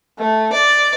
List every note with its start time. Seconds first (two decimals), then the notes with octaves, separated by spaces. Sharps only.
0.18 A3
0.52 D5